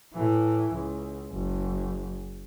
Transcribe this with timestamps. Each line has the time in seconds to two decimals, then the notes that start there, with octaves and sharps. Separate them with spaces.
0.14 A2 E3
0.73 C#2
1.32 F#1